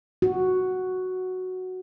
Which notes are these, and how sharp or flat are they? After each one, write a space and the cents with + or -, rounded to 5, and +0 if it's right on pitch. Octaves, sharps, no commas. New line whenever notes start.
F#4 +0